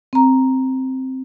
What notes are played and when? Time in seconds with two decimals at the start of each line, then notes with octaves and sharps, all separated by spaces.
0.13 C4 A#5